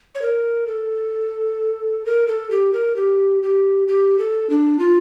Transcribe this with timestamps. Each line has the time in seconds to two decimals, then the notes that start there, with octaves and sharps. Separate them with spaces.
0.15 C#5
0.22 A#4
0.67 A4
2.05 A#4
2.28 A4
2.51 G4
2.73 A#4
2.96 G4
3.43 G4
3.88 G4
4.19 A4
4.50 D4
4.79 F4